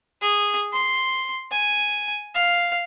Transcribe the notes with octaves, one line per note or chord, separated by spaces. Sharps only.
G#4
C6
G#5
F5